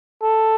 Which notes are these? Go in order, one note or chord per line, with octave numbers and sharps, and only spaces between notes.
A4